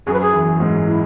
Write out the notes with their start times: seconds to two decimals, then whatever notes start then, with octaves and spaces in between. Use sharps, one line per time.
0.06 F#2 F#3 G#4
0.13 B4
0.21 G#4
0.33 E2 E3
0.60 G#2 G#3
0.87 E4